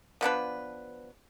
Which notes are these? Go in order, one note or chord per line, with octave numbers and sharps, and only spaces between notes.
F3 B3 D4 B4